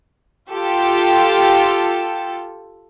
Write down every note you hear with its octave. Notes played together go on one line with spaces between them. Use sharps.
F4 G4 A4